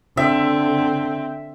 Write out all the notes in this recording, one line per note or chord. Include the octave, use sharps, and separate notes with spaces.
D3 C4 E5